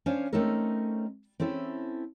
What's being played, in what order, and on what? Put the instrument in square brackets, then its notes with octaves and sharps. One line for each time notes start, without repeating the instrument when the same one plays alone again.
[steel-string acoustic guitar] C#4 D4 C5 C#5 F5 G#5
A3 C4 C#4 D#4 A4 A#4
C4 C#4 E4 A4